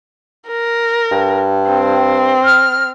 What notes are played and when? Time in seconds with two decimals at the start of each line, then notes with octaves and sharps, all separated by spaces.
0.48 A#4
1.11 G2
1.69 C4
2.43 F6